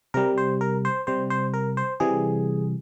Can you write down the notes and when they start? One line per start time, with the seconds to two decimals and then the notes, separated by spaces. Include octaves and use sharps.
0.14 C3 G3 A#4
0.38 C5
0.61 A#4
0.85 C5
1.07 C3 G3 C5
1.30 C5
1.54 A#4
1.77 C5
2.00 C3 E3 G3 G#4